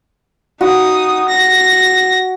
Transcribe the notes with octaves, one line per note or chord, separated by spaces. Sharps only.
D#4 F#4 D#6
A#6